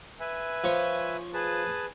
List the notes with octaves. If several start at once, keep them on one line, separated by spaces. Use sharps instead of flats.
B4 E5 G#5
F3 C#5
G#4 B4 A5